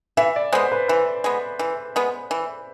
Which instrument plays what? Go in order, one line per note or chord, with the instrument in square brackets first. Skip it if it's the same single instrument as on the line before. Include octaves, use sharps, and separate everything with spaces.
[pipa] E3 [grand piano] E5
[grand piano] D5
[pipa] G#3 B3 [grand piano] C5
[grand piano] B4
[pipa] E3 [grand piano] B4
[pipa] G#3 B3
E3
G#3 B3
E3